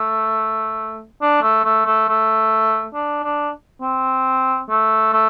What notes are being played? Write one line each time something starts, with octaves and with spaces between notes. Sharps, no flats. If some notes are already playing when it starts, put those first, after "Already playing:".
Already playing: A3
D4
A3
A3
A3
A3
D4
D4
C4
A3
A3